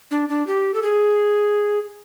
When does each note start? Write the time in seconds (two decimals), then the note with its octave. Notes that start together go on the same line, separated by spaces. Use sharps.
0.11 D4
0.29 D4
0.47 G4
0.74 A4
0.83 G#4